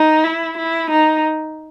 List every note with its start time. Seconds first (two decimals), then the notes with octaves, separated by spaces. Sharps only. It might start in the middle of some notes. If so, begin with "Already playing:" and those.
Already playing: D#4
0.24 E4
0.58 E4
0.91 D#4